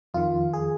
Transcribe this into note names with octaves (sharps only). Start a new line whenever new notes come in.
F2 D#3 F4
G#4